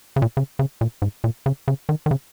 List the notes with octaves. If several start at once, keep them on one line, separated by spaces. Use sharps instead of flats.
C#3
A#2
C#3
C#3
A#2
G#2
A#2
C#3
C#3
D#3
D#3
C#3